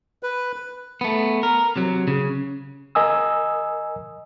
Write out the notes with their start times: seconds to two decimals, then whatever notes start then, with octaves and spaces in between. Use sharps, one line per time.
0.23 B4
1.01 A3 B3
1.43 A#4
1.76 C3 F#3
2.08 C#3
2.95 A#4 D#5 G#5 D#6 E6